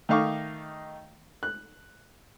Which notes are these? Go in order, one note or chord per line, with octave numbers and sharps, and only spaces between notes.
D#3 A3 D#4 F5 C#6 D6
F#6